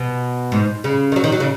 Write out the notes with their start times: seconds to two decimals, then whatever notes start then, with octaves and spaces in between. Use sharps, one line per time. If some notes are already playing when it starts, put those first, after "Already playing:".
Already playing: B2
0.52 G#2
0.84 C#3
1.12 D#3
1.16 F#3
1.24 D#3
1.32 F#3
1.40 C#3